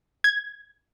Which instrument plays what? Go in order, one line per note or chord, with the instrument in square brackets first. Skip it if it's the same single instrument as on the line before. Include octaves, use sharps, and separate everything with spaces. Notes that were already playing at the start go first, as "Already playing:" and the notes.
[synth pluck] G#6